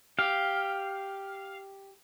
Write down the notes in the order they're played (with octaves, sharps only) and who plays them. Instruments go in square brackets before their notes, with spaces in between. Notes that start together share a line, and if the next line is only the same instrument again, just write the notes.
[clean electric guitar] G4 [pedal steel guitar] F5